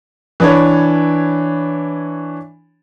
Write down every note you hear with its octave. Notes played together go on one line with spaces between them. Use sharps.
E3 D4 C#5